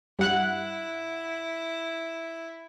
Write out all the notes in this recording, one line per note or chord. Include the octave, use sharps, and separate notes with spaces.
G2 E4 F#5 F#6